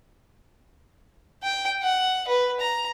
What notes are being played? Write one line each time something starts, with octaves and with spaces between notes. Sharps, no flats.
G5
F#5
B4
A#5